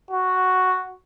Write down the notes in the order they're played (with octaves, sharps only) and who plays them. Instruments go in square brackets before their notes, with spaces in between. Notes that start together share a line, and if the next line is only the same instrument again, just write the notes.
[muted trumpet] F#4